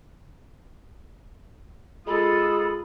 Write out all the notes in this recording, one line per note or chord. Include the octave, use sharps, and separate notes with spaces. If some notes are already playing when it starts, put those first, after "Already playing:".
G#3 F4 A4 B5 D#6